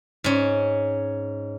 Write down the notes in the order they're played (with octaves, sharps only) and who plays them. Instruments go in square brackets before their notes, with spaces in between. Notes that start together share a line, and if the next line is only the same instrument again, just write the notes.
[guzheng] G#2 C#4